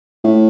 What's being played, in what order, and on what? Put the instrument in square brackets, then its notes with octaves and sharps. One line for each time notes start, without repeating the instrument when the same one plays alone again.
[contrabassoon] A2